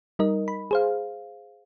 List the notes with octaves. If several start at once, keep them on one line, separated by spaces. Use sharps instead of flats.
G3 D#4 A#4 D#5
B5
G#4 C5 F5